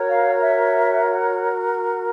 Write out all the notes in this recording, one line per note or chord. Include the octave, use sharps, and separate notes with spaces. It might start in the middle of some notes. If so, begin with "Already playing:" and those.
Already playing: F#4 A#4 C#5
F5
E5